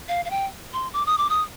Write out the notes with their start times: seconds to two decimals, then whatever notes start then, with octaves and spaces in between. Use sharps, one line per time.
0.08 F5
0.25 F5
0.30 G5
0.73 C6
0.93 D6
1.06 D#6
1.18 D6
1.30 D#6